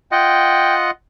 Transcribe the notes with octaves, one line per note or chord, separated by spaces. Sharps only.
F4 D#5 F#5 G5